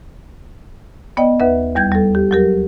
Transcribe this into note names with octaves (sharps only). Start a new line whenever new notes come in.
B3 D5 D#5 G5
D#2 B4 E5
E2 G3 G6 G#6
G3 A4
G4
F#3 G4 A#4